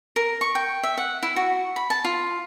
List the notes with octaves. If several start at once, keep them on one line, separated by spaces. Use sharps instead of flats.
A#4
C#6
G5
E5
F#5
E4
F#4
B5
A5
F4